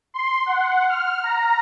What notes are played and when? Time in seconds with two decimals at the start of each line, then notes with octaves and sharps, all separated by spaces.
0.14 C6
0.46 F#5
0.89 F6
1.24 A#5